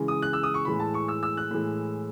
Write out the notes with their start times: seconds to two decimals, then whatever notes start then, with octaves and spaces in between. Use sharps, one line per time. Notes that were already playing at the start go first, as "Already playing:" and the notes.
Already playing: C#3 E3 G#3
0.08 D#6
0.22 F#6
0.33 E6
0.43 D#6
0.54 C#6
0.65 A2 E3 G#3 B5
0.80 A5
0.94 C#6
1.08 E6
1.23 E6
1.37 F#6
1.51 A2 E3 G#3